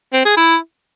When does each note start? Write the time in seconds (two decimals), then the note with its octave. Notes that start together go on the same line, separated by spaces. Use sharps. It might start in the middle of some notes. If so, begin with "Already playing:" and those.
0.13 C4
0.25 G#4
0.37 E4